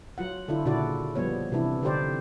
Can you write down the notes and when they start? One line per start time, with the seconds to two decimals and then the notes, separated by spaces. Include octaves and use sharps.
0.18 F#3 F4 F#5
0.48 D3 D4 E4 F4
0.65 A#2 C#3 D4 E4 F#4 D5
1.15 F3 G3 B3 C#5
1.52 C3 E3 D4 E4
1.83 D3 C4 D#4 G4 C5 D5